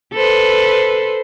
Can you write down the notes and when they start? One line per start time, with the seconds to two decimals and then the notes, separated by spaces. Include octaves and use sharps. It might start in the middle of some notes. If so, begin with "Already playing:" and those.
0.13 A4 B4 C5